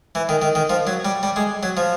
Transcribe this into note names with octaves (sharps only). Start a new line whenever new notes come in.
E3
D#3
D#3
D#3
F3
F#3
G3
G3
G#3
F#3
F3